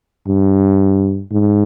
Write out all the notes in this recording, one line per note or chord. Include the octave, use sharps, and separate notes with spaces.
G2
G#2